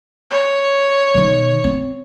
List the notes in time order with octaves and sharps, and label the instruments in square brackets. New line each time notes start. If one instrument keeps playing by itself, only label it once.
[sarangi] C#5
[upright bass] B2 D#3
C4